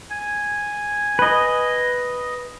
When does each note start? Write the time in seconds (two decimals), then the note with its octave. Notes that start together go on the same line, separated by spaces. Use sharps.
0.11 G#5
1.19 B4 D#5